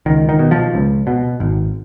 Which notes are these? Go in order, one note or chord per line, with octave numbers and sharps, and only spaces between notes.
C#2 D#3
D#3
B2
F3
C#2
B2
G#1